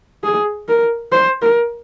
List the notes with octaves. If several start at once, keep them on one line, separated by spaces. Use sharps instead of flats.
G#4
A#4
C5
A#4